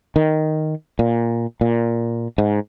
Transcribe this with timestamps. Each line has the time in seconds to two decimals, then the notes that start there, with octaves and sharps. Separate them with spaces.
0.16 D#3
0.99 A#2
1.61 A#2
2.38 G#2